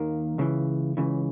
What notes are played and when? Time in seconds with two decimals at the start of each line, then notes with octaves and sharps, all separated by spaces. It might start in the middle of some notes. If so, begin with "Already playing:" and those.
Already playing: D#2 D#3 A#3
0.38 C#2 C#3 E3
0.97 C#2 C#3 E3